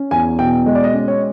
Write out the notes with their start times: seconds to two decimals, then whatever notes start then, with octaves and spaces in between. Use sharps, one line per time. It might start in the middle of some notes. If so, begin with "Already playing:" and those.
Already playing: C#4
0.11 E2 G#5
0.39 B2 G5
0.66 G#3 D#5
0.75 D5
0.84 D#5
0.94 C#4
1.08 C#5